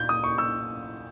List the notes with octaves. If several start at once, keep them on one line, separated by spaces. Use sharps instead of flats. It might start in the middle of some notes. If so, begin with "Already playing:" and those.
Already playing: A#2 G6
D#6
C#6
E6